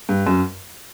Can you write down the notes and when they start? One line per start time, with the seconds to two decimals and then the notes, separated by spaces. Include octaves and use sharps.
0.09 G2
0.27 F#2